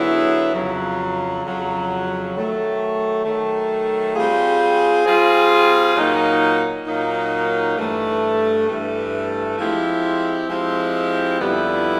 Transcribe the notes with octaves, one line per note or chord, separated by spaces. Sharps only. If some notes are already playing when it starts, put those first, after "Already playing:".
Already playing: D3 F#3 B3 E4 G#4
F2 C#3 F#3
F2 C#3 F#3
D#3 F#3 A3
D#3 F#3 A3
G3 C4 F4 G#4
G3 C4 F4 G#4
A#2 F#3 A#3 D#4
A#2 F#3 A#3 D#4
G2 E3 A3
G2 E3 A3
F3 G#3 C4 E4 G4
F3 G#3 C4 E4 G4
F2 D3 G3 B3 E4